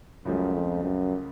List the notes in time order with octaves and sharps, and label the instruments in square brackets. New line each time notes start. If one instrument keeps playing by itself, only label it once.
[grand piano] C#2 C#3 F3 A3 [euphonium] F#2
[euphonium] F2
F#2